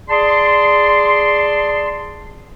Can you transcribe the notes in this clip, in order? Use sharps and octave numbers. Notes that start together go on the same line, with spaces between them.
G#4 D5 A5 C6